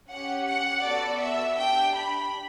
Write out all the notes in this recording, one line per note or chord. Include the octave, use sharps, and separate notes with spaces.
C#4 G4 F#5
F#5
B3 F#4 A4 D5
E5
D4 G4 G5
B5